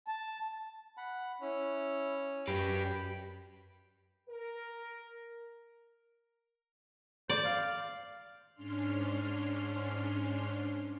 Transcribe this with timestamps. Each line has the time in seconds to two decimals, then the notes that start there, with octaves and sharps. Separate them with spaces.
0.08 A5
0.97 F#5 B5
1.42 C#4 E4
2.48 F#2 G4 B4 G5 B5
4.29 A#4
7.30 C5 D5
7.45 F5
8.53 G#2 C#4 D4 C6 F6